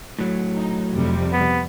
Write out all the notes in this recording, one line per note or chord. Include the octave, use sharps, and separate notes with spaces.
A2 F#3
D#4
F2 C3 G3
B3